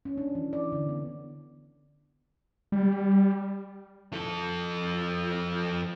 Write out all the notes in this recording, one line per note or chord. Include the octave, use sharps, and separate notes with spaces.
C#4
D4
E3
D5
D3
B3
G3
F2 A4